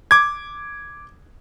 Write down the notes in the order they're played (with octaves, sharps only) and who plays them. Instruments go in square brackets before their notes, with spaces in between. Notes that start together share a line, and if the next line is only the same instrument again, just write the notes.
[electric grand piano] D6 G#6